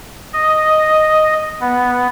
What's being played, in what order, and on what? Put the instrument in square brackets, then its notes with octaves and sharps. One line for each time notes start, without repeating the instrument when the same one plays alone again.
[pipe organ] D#5
B3